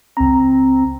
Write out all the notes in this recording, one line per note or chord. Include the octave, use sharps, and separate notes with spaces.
C#2 C4 A#5